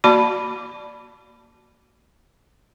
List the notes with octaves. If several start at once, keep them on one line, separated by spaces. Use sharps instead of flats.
A#3 F#4 D5 A5 B5 D6